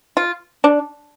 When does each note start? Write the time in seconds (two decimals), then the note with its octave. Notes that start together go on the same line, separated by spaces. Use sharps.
0.17 F4
0.64 D4